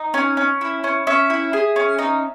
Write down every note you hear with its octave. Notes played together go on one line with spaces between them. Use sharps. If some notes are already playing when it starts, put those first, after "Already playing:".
Already playing: D#4
C#4 G#5
C#4
E4
C#4
C#4 E5
E4
G#4
C#4
D#4